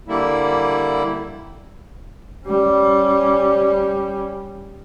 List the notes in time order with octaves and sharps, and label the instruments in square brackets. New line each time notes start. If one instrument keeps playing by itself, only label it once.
[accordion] D3 G3 A#3 E4
[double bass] G3 C#4